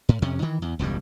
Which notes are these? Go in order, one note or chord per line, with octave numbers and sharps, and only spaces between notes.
A2
F2 C3 C#4
D#3 E3
E2
E1 C#2 A2 G3